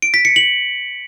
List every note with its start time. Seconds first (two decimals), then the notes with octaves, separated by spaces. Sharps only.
0.02 D7
0.14 B6
0.25 C#7
0.36 F#7